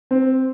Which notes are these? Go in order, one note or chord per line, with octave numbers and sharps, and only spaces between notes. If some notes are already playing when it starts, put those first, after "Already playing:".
C4